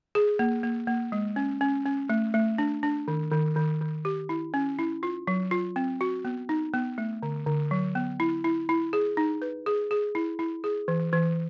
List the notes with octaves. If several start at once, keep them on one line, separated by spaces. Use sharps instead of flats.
G#4
A#3
A#3
A#3
G#3
C#4
C#4
C#4
A3
A3
D4
D4
D#3
D#3
D#3
D#3
G4
E4
C#4
E4
F4
F#3
F4
C4
F#4
B3
D#4
B3
A3
D3
D3
F#3
B3
E4
E4
E4
G#4
D#4
B4
G#4
G#4
E4
E4
G#4
E3
E3